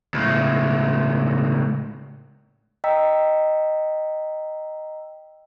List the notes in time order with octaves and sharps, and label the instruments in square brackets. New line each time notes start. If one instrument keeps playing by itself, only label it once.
[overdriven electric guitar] C#2 A2
[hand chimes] D#5 G5 A#5 E6 B6